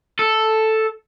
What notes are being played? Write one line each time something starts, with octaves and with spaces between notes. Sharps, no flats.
A4